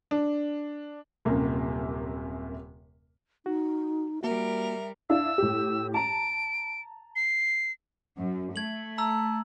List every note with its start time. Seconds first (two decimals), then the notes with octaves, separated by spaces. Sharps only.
0.11 D4
1.25 D#1 F#2 C3 A#3
3.46 D#4 F#4
4.23 G3 A#3 F#4 A#4 E5
5.10 D4 E4 F5 E6
5.38 A2 G4
5.94 A5 A#5 D7
7.16 C7
8.19 F#2
8.56 A3 G#6 F#7
8.98 A5 A#5 E6